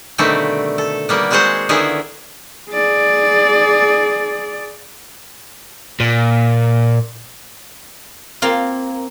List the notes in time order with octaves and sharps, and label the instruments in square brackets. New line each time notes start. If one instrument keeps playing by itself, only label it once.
[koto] B2 D3 D#3 G3 A3 C4
A4
G3 A#3 B3
G#3 C4 F#4 G#4 C5 F#5
D3 D#3 B3 E4 G#4
[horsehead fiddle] G#4 D5
[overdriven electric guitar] A#2
[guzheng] A#3 C4 F4